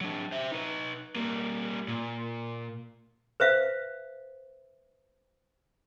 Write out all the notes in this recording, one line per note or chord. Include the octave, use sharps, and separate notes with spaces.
F#3 D4
C5 E5
D#4 B4
G3 A#3
A#2
B4 C5 E5 F5